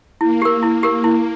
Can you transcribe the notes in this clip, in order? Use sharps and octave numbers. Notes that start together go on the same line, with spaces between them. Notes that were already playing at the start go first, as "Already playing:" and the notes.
A#3 E4
G4 A#4
E4
G4 A#4
E4